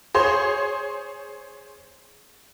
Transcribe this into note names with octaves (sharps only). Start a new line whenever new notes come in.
G#4 C5 C#5 C6